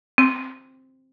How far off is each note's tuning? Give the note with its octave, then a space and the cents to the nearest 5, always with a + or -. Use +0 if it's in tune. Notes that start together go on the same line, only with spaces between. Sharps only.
C4 +5